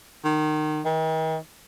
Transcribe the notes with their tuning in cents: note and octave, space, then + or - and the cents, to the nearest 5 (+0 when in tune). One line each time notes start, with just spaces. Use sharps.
D#3 -25
D#3 +45